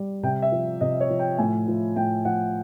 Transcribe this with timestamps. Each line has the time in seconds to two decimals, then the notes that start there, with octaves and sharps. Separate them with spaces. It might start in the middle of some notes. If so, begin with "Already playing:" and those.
Already playing: G3
0.23 C3 G5
0.42 E5
0.52 F3
0.81 C3 D#5
1.01 C#5
1.10 F3
1.19 G5
1.38 A2 G#5
1.68 F3
1.96 A2 G5
2.25 F3 F#5